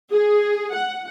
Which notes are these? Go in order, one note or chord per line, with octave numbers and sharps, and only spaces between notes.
G#4
F#5